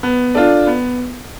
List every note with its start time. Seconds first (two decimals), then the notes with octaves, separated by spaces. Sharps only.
0.03 B3
0.34 D4 F4 A4 D5
0.67 B3